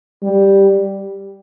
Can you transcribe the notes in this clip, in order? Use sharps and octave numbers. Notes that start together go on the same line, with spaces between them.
G3